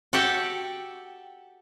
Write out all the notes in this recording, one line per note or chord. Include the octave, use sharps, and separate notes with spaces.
F#4 G4 A4 E5 F#5 G5